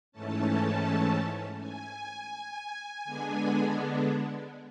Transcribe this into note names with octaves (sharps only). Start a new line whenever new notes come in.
G#2 E3 A3 C#4 A5
G#5
D3 G#3 B3 D4